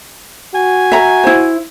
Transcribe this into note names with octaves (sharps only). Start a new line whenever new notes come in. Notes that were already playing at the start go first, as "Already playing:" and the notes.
F#4 G#5
E5 A#5
E4 C5